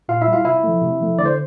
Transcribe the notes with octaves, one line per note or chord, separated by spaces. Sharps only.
A#2 F4 F5
E4 E5
G3
F4 F5
C3 E4 E5
F3 A3
C3
F3 A3
D3 D5
C5